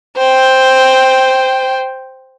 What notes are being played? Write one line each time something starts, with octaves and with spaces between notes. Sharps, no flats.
C5 G5